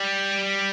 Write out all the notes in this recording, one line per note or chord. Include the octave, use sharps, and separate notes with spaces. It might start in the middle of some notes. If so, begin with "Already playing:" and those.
Already playing: G3